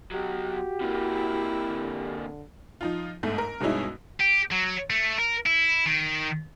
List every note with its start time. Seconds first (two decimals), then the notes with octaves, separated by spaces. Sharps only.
0.12 B2 F#3 F#4 G4
0.81 C3 A#3 E4
1.68 D3
2.81 F3 D#4 F4
3.23 G1 G#2 A3
3.38 A#4
3.60 G2 B2 G#3 C#4 D#4 E4
4.20 G4
4.52 F#3
4.90 A3
5.18 A#4
5.46 E4
5.86 D#3